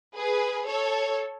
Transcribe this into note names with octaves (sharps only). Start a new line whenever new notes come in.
G#4 B4
A4 C#5